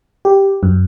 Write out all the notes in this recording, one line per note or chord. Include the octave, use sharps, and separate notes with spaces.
G4
F#2